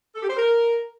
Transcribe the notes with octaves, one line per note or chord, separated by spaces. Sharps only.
A4
G4
C5
A#4